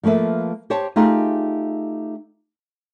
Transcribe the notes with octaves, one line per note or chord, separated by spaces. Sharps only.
F3 A3 A#3 B4 E5
G4 C5 C#5 A5
A3 D#4 F4 G4 G#4